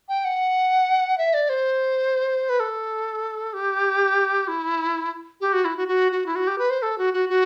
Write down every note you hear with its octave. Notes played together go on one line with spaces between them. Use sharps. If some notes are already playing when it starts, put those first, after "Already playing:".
G5
F#5
E5
D5
C5
B4
A4
G4
E4
G4
F#4
E4
F#4
F#4
F#4
E4
F#4
G4
B4
C5
A4
F#4
F#4
F#4